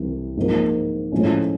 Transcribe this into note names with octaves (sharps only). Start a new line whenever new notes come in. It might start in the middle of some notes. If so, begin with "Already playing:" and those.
Already playing: C2 C3 E3
G#2 F3 A#3
A2 F3 G#3 C#4